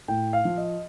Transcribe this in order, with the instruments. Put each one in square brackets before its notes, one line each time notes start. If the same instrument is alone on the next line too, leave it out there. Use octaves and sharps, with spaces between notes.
[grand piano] A2 G5
F5
F3
D#5